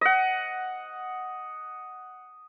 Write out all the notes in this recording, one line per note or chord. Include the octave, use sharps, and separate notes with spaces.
D#5 F#5